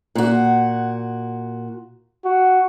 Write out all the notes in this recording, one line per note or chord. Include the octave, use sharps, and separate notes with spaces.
A#2 F#4
F#4